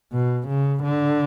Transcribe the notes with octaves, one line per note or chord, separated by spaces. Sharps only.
B2
C#3
D3